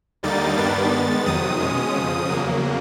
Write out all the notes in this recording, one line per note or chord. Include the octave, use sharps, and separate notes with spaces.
D#2 D3 G3 A#3 D#4 A6
G2 D#3 G3 B3 D4 A6
D#3 G#3 B3
F2 C3 D#3 F#3 D#6
B2 G#3 C#4
F2 C#3 F3
E2 C#3 F#3 A#3